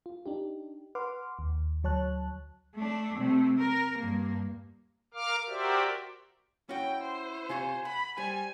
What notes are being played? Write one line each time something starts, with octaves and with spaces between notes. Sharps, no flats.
F4
D4 D#4 G4
B4 F#5 C6 D6 F6
D#2
D2 F#3 C#5 A5 F#6
A3 D4
C3 A3
A#4
G2 A#3
A#4 F5 D6 F6
F#4 G4 A#4 C5 D5 E5
C#4 E4 F#4 G5
C5
C3 F4 C#5 G#5
F#5 B5
G3 C5 G#5